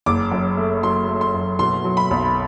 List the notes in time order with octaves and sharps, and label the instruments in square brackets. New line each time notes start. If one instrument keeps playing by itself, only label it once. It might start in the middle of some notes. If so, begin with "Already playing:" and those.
[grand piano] F#1 D6
F#2
A3
F#3 C6
A3
C6
F#2
B2 C6
F#3
B5
B1